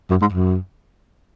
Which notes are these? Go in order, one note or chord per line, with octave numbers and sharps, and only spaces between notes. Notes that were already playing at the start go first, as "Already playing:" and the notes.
F#2
G#2
F#2